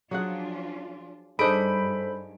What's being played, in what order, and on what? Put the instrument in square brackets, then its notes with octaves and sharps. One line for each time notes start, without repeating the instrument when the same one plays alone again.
[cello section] F3 D4 F4 [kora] F#3 G#4 F#5
[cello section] G2 [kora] D4 D#4 G#4 [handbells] A4 C5 [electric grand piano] B5 D7